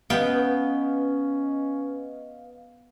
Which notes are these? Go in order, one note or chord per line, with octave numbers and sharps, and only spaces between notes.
B3 C#4 B4 D#5 F5 G5